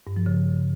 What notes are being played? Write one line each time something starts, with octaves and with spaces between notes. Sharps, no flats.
G2
F3
C#3